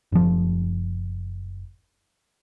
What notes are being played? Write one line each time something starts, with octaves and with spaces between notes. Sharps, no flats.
F#1 F3